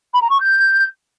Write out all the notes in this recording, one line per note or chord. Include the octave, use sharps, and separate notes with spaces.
B5
A#5
C#6
G6